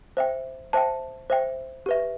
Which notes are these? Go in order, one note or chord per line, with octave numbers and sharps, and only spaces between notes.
C5 E5 G5
C5 E5 G5 A5
C5 E5 G5
G4 B4 E5